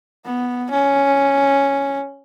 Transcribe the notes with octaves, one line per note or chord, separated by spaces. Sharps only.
B3
C#4